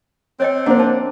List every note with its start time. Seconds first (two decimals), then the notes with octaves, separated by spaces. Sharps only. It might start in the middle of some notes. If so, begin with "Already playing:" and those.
0.40 C4 C#5 D#5 G5
0.66 A#3 D4 C5 F#5
0.79 C5 A5